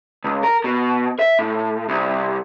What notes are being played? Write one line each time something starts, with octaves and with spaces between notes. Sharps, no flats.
C#2
A#4
B2
E5
A2
C2